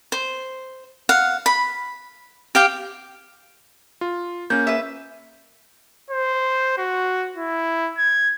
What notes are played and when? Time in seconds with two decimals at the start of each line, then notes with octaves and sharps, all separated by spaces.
0.12 C5
1.09 F5 F#5
1.46 B5
2.55 G4 F5 G5
4.01 F4
4.50 A#3 C#4 G6
4.67 B4 E5
6.10 C5
6.77 F#4
7.36 E4
7.98 G#6